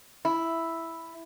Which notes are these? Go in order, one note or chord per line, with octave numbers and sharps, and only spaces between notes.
E4